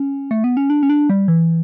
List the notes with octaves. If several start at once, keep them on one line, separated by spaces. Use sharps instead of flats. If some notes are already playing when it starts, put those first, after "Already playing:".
Already playing: C#4
A3
B3
C#4
D4
C#4
D4
G3
E3